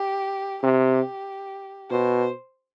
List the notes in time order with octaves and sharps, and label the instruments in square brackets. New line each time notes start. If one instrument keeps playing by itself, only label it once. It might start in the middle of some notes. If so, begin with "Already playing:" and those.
Already playing: [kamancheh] G4
[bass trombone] C3 [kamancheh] G4
[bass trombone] B2 [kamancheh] C5